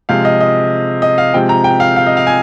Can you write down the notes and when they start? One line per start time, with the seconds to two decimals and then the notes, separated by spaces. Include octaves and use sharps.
0.09 C3 F3 G#3 F5
0.25 D#5
0.40 D#5
1.02 D#5
1.18 F5
1.34 C3 F3 G#3 G5
1.49 A#5
1.64 G5
1.80 F5
1.96 F5
2.06 D#5
2.17 F5
2.27 G#5